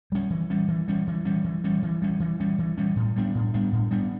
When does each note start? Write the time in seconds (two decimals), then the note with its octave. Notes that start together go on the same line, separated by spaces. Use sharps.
0.12 G3 C#4
0.30 E3
0.50 G3 C#4
0.68 E3
0.88 G3 C#4
1.07 E3
1.25 G3 C#4
1.44 E3
1.64 G3 C#4
1.82 E3
2.02 G3 C#4
2.20 E3
2.40 G3 C#4
2.58 E3
2.77 G3 C#4
2.96 A2
3.16 G3 B3 D4
3.35 A2
3.54 G3 B3 D4
3.72 A2
3.91 G3 B3 D4